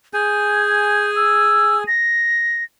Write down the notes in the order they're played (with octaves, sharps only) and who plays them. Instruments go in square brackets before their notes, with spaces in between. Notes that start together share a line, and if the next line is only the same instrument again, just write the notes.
[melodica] G#4 G#5 [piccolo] G6
[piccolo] E6
A#6